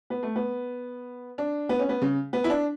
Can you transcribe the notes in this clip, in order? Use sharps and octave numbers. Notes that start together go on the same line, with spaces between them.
B3
A3
B3
D4
B3
C#4
B3
C#3
B3
E4
D4